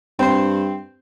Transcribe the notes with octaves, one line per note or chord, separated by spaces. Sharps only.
G2 C4 C5